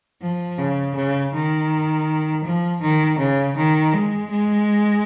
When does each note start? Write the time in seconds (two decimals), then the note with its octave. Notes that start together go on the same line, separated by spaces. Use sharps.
0.22 F3
0.58 C#3
0.95 C#3
1.33 D#3
2.44 F3
2.82 D#3
3.19 C#3
3.56 D#3
3.93 G#3
4.31 G#3